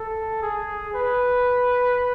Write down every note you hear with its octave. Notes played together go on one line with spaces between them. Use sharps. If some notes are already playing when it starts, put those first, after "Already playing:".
Already playing: A4
G#4
B4